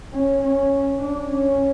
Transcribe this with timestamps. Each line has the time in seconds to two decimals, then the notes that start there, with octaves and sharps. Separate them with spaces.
0.13 C#4
0.43 C#4
1.02 D4
1.31 C#4